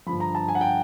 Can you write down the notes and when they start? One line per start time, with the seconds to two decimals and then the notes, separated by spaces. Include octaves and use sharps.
0.06 G2 D3 F3 B5
0.20 A#5
0.35 A5
0.48 G#5
0.55 F#5
0.61 G5